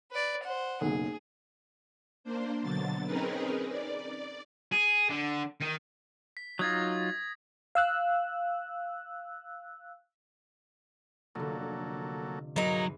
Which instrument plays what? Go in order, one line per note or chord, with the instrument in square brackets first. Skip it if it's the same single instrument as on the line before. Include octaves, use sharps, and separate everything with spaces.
[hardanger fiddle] B4 D5
C5 F#5
[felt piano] F#1 B1 [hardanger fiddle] G#4
[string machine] A#3 D4 C5
B2 D3 F#3 A6
C4 C#4 D#4 G#4 A#4 B4
D5
[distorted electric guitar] G#4
D3
D#3
[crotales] B6
[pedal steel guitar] F#3 D#4 F4 [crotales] D#6 G#6 A#6
[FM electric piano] F5 E6 F#6
[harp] F1 D3 [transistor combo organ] F#3 A#3 A4
[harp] E2 G#2 [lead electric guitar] F#3 [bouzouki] A#3 D#4